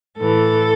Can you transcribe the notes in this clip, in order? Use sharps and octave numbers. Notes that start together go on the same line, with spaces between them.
A2 E3 A4